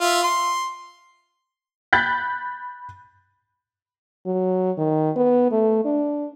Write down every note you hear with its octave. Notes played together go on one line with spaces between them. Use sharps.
F4 E5
C6
B5 F#6 G6 A6 B6
F#3
D#3
B3
A3
D4